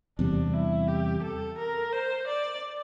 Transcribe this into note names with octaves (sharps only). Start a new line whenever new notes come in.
E2 C3 G3 D4
E4
G4
A4
A#4
C5
D5